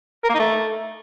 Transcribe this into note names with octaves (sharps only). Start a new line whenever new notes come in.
A#4
A#3
D#4
A3